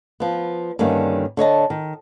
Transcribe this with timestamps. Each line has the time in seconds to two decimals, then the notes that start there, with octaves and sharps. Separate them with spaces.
0.20 F3 B3
0.79 G2 D3 D#3 A#3 C#4
1.37 D3 C#5 D#5 A5
1.70 D#3